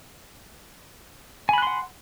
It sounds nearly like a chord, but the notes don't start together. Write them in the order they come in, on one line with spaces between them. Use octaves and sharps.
G#5 B5 F#6 C6 F#5